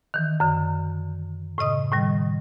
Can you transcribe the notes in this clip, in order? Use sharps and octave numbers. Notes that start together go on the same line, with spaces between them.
D#3 E3
F#2 D3
A2 C#3 D#5 D#6
A2 D#3 G3